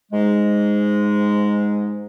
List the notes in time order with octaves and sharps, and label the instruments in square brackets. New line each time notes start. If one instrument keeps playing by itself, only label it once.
[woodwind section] G#2 G#3